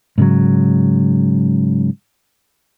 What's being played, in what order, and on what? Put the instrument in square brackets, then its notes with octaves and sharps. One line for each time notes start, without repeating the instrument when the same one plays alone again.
[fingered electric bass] G#2 C#3 F#3